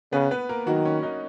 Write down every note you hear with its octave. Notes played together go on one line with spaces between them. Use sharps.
C#3 B3 B4
B3 B4
A#3 A#4
D#3 F#3 F#4
C#4
D#4